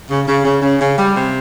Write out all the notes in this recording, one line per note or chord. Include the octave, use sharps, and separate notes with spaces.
C#3
C#3
C#3
C#3
C#3
G3
C3